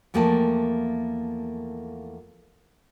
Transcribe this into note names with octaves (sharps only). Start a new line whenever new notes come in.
E2 F3 A3 A#3 G5 A5